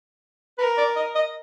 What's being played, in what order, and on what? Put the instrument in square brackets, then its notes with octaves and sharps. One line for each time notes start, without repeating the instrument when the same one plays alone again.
[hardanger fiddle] A#4 [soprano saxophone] B4
[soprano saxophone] D5
D#5
D#5